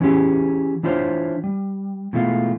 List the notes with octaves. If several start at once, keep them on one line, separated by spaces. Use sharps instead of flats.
E3 C#4 E4 G4 G#4
E3 D4 E4 F4 C5 C#5
G3
B2 E3 G#3 A3 E4 F4